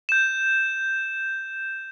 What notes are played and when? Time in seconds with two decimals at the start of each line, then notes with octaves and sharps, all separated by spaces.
0.09 G6 E7